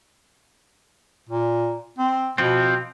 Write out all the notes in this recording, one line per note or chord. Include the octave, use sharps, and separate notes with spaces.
A#2
C4
B2 F3 C4